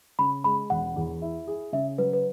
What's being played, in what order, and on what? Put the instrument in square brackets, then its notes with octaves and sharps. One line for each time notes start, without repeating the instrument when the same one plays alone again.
[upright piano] C#3 [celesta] B5
[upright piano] G#3 [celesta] B5
[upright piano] E1 [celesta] F#5
[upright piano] E2
E4
G#4
[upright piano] C#3 [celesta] E5
[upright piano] F#3 [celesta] B4
[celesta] B4